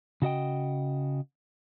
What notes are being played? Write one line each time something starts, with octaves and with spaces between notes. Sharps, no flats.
C#3 F#4 D#5 G5